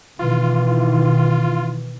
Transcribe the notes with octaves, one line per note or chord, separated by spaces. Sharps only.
B2 D#3 E3 F4